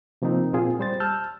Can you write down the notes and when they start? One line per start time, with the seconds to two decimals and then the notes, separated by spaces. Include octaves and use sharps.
0.22 C3 F3 A#3 C4 D#4
0.53 A#2 A#3 C4 F4 G#4
0.79 G3 C5 A6
1.00 A5 E6 F6 G6